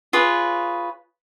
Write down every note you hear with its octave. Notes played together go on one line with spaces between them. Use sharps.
F4 G#4 B4 C#5